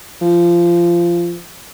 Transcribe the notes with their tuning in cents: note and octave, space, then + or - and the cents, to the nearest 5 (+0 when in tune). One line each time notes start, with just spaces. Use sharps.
F3 -20